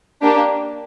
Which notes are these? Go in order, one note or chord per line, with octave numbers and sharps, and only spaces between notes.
A#3 D4 G4